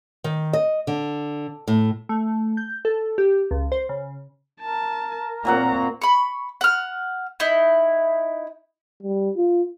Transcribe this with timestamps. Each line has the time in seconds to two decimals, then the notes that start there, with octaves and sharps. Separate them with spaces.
0.24 D#3
0.53 D#5
0.87 D3
1.68 A2
2.09 A3
2.57 G6
2.85 A4
3.18 G4
3.51 C#2
3.72 C5
3.89 C#3
4.61 A#4 A5
5.45 A#2 F#3 A#3 C4 F#5 A#5
6.02 B5 C#6
6.61 F#5 F6
7.40 D#4 E4
9.03 G3
9.36 F4